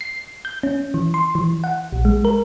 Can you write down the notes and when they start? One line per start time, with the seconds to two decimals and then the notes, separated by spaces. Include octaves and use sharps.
0.01 C7
0.45 G6
0.63 C#4
0.94 E3
1.14 C6
1.35 E3
1.64 F#5
1.93 A#1
2.05 G#3
2.25 A#4